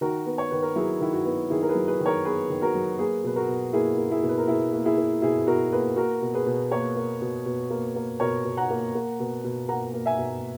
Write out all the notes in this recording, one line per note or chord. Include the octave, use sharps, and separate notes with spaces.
D#3 F#4 A#4
B3
C#5
D#3 B4
A#4
F#3 E4 G#4
D#3 E4
F#4
B3
D#3 E4 G#4
A#4
G#4 B4
F#3
G#4 B4
D#3
A#4 C#5
B3 G#4 B4
D#3
F#4 A#4
F#3
A#3 G#4 B4
B2 B4
F#4 A#4
B2
A#3 E4 G#4
A#3
E4 G#4
B2
B4
A#4
B2 E4 G#4
A#3
E4 G#4
A#3
B2 E4 G#4
B2 F#4 A#4
A#3 G#4 B4
A#3 F#4 A#4
B2
G#4 B4
B2
A#3 A#4 C#5
A#3
B2
B2
A#3
A#3
B2 A#4 C#5
B2
F#5 A#5
A#3
A#3
B2
B2
A#3 F#5 A#5
A#3
E5 G#5
B2